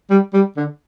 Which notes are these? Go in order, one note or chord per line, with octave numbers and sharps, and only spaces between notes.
G3
G3
D3